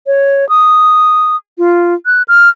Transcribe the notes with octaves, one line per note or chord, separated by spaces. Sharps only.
C#5
D#6
F4
F#6
F6